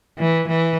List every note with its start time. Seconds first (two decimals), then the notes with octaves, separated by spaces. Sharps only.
0.19 E3
0.49 E3